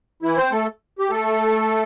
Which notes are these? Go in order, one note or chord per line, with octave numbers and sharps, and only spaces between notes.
E3 E4
C4 C5
A3 A4
G4
A3 A4